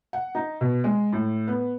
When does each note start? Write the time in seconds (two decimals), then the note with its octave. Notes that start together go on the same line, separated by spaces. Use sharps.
0.13 F#5
0.35 D#4
0.61 B2
0.84 G#3
1.13 A2
1.47 B3